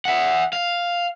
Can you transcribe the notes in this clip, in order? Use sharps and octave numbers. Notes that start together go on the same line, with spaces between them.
E5 F#5
F5